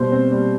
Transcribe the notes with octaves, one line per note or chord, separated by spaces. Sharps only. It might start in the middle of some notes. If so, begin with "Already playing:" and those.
Already playing: B2 G3 C5
C4
G3